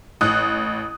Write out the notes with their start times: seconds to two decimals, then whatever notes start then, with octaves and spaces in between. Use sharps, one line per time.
0.21 A1 D#6 F#6